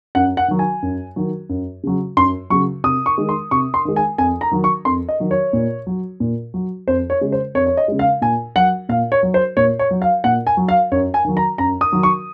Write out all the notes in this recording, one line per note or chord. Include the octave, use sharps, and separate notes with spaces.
F#2 F#5
F#5
D#3 F#3
G#5
F#2
D#3 F#3
F#2
C#3 F#3
F#2 C6
C#3 F#3 C#6
C3 D#6
C#6
D#3 G#3
C6
C3 C#6
C6
D#3 G#3
G#5
F2 G#5
A#5
D#3 F#3
C#6
F2 C6
D#5
D#3 F#3
C#5
A#2
F#3
A#2
F#3
F2 C5
C#5
C#3 G#3
C5
F2 C#5
C#5
D#5
C#3 G#3
F5
A#2 G#5
F#3 F#5
A#2 F5
C#5
F#3
C5
A#2 C#5
C#5
F#3
F5
A#2 F#5
G#5
F#3
F5
F#2 C#5
G#5
D#3 F#3
A#5
F#2 A#5
D#6
D#3 F#3
C#6